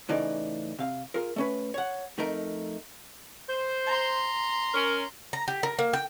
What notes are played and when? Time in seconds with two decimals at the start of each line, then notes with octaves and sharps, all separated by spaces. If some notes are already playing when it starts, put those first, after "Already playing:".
0.09 A2 C#3 E3 D#4 D5
0.79 C3 F5
1.14 F4 G#4 A#4
1.36 A3 C#4 B4
1.74 C#5 F#5
2.18 F2 A3 D#4 A#4 A#5
3.49 C5
3.86 A#5 C6
4.74 C#4 A#4
5.33 A#5
5.48 G4
5.63 A#4
5.79 A#3
5.93 G5